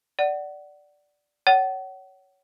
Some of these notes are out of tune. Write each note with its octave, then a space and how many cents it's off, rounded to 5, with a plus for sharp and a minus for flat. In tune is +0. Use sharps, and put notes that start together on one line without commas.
D5 +0 F#5 +20
C#5 +15 F#5 +35